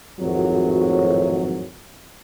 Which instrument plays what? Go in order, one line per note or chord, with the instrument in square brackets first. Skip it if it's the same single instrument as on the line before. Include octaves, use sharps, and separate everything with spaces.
[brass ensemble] G#1 F2 A2 F#3